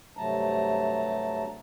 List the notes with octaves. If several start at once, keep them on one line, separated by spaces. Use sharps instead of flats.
G2 C3 F#3 A3 A5 A#5